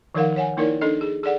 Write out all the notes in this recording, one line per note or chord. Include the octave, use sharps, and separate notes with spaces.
D#3 F3 D#4 A#4 F5 F#5
C#5 F#5 G#5
A#3 D#4 E4 A#4 C#5 D5
D4 D#4 A4 D#5
G#4
G#4 A4 D5 F#5